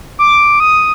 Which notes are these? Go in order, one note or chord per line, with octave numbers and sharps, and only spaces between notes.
D6
D#6